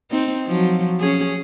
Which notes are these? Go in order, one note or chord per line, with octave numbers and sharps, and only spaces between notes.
C4 D#4
F3 F#3
C#4 G#4